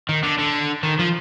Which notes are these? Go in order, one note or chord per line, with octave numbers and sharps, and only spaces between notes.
D#3
D3
D3
D#3
F3